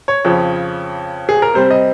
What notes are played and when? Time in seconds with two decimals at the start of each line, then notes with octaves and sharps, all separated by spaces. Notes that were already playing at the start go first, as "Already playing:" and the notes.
0.08 C#5
0.25 F2 C#3 F3
1.29 G#4
1.42 A#4
1.54 C3 G3 C4 C5
1.70 D#5